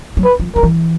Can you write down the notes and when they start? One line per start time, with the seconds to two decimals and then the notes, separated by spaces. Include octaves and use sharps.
0.17 F#3
0.24 B4
0.40 F3
0.55 F3 A#4
0.63 E3